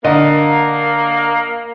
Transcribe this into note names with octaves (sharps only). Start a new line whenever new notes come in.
D3 A#3 D#5